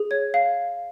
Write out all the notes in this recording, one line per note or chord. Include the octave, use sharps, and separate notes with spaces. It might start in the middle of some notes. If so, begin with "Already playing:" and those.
Already playing: G#4
C#5 G#6
F5